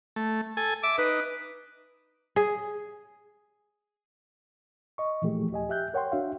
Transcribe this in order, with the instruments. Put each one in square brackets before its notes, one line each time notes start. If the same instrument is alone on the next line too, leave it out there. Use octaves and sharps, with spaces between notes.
[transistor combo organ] A3
A4 G#5
[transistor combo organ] E5 [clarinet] D6
[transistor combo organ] D#4 [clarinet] B4
[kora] G#4
[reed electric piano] D#5 C#6
A#2 E3 F3 A3 G4 G#4
D#2 G4 D#5 G#5
G4 E5 F#6 G6
A#4 C#5 F#5 G5 C6
D4 F#4 E5 F5